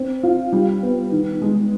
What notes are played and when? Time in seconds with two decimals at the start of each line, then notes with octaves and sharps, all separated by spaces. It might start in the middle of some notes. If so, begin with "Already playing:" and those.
Already playing: C4
0.23 F4
0.52 G3
0.83 B3
1.12 D#3
1.42 G#3